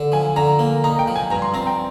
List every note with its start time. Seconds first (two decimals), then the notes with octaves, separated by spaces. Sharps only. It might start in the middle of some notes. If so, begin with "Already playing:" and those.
Already playing: D3
0.12 F3 G#5
0.36 D3 A#5
0.59 A#3
0.84 D#4 A#5
0.99 G5
1.08 F3
1.16 G#5
1.31 G2 A#5
1.42 C6
1.54 C4 A#5
1.67 G5